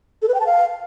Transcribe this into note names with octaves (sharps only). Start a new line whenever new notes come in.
A4
B4
G5
A5
F5